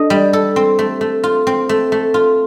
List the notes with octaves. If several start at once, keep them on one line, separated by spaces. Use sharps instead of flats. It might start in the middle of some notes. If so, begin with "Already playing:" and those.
Already playing: D4 A4 D#5
G3
A4
C4
A3
A3
F4
C4
A3
A3
F4